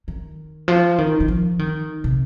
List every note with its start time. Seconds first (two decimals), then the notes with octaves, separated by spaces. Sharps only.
0.08 D#3
0.68 F3
0.98 D#3
1.20 D#3
1.28 F3
1.59 D#3
2.04 C3